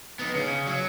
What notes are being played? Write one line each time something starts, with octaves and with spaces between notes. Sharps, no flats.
B3 D#4
C#3
F#3